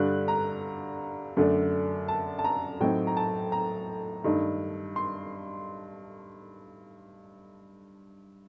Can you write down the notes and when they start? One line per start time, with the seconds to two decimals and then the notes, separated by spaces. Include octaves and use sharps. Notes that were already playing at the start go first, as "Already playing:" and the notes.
Already playing: G2 D3 G3 F#6
0.28 A#5
1.37 F#2 D3 A3 D4
2.08 A5
2.39 A5
2.44 A#5
2.80 A2 F#3 C4 D#4 G5
3.07 A#5
3.17 A5
3.52 A#5
4.24 G2 D#3 A3 D#4
4.96 C6